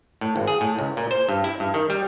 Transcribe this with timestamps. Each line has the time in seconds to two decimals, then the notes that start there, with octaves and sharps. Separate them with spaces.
0.21 A2
0.36 G#1
0.48 G#4
0.61 A2
0.79 C#2
0.97 A#2
1.11 C5
1.29 G2
1.44 E4
1.60 G2
1.74 D#3
1.90 G3